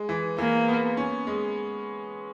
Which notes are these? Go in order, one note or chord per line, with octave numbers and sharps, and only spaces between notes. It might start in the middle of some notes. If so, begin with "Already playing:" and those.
Already playing: G#3
E3
E3 A#3
B3
C#4
G#3